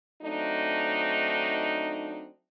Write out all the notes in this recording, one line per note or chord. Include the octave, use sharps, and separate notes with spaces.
F#3 A3 C4 D4 D#4